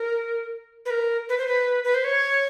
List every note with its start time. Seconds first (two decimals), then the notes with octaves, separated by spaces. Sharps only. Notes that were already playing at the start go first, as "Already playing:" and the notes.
Already playing: A#4
0.85 B4
0.90 A#4
1.29 B4
1.38 C5
1.47 B4
1.84 B4
1.94 C5
2.04 C#5